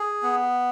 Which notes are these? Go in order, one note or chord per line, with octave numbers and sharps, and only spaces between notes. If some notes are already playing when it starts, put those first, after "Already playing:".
Already playing: G#4
B3